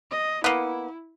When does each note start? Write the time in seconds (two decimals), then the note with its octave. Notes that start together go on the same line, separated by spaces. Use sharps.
0.11 D#5
0.44 A#3 B3 E4